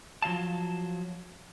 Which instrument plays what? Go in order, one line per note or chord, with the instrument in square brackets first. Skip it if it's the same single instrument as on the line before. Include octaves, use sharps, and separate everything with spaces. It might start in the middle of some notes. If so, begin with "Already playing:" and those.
[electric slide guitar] F3 F#3 F5 A5